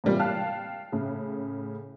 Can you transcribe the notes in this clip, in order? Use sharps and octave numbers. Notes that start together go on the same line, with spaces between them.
A2 C3 E3 G3 A#3 F4
F5 G5 A5 F6 F#6
A2 C#3